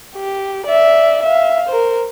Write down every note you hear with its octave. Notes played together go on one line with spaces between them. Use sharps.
G4
D5 E5
E5 F5
A#4 C5